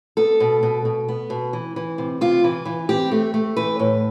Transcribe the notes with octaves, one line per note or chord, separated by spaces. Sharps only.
B3 A4
B2
B2
B2
B3
B2
E3
E3
C3
C3 F4
E3
E3
C4 G4
A3
A3
E3 B4
A2